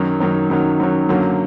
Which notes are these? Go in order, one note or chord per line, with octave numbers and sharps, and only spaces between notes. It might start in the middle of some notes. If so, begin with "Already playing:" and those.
Already playing: F#2 D#3 F#3
F#2 D#3 F#3
F#2 D#3 F#3
F#2 D#3 F#3
F#2 D3 F#3 A#3